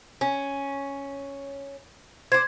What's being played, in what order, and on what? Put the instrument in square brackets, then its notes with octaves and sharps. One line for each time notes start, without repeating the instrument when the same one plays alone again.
[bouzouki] C#4
[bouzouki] C5 D5 [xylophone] G#6